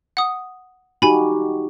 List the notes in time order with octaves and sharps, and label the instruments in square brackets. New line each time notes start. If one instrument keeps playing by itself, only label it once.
[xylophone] F#5 D#6
[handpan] D#4 F#4 G4 [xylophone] G#5 B5